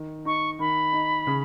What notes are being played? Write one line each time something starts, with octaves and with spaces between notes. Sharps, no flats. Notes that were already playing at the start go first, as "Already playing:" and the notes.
Already playing: D#3
D#4 C#6
D#3 B5
D#4
C#3